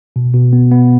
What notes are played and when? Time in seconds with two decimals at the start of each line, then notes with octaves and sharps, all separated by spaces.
0.16 B2
0.34 B2
0.53 B3
0.71 B3